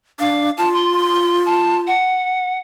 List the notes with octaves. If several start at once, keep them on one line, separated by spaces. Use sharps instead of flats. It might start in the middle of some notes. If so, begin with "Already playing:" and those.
D4 F5
F4 A5
C6
A5
F#5